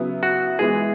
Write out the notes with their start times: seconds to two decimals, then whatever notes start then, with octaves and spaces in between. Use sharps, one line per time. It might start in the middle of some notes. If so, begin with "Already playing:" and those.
Already playing: C#3 F#3 B3 E4
0.23 F#4
0.59 E3 G#3 B3 E4 G#4